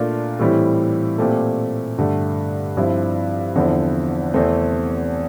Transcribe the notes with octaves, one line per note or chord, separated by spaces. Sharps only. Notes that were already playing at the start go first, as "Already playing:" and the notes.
Already playing: A#2 A3 D4 F4 A#4
A2 E3 G3 C4 E4
A#2 A3 C4 G4
G2 D3 A3
G2 F3 C4 E4
E2 D3 F3 C4 E4
E2 C3 E3 A3 C4